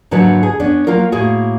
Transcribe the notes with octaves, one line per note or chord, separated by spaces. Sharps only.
G#2 D3 F#3 A#3 B4
G#4
B3 C#4 D4
F#3 A#3 F4 A#4
A2 A#3 F#4 G#4